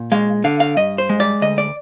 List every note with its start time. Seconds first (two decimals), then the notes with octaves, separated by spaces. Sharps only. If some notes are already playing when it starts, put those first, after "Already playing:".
Already playing: A#2
0.12 G#3 F5
0.44 D3 F5
0.60 F5
0.77 G2 D#5
0.98 C5
1.09 G#3
1.20 D5
1.42 D2 D#5
1.58 D5